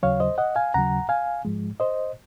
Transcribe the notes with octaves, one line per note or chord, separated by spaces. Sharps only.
D#2 C#3 F#3 C#5 F5
C5 D#5
D#5 F#5
F5 G#5
D#2 C#3 F#3 F#5 A#5
F5 G#5
G#2 F3 G#3
C5 D#5